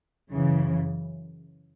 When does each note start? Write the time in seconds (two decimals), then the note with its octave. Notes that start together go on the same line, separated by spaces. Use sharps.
0.31 F#2 C#3 E3